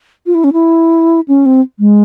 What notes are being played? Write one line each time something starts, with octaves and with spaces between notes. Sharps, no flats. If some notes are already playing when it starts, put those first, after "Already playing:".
F4
E4
C#4
E4
C#4
C4
G#3